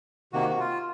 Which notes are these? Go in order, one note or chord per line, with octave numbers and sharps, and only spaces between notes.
C3 D#3 A#3 F#4
F#4
F4